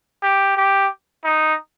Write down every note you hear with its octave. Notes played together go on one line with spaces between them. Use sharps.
G4
G4
D#4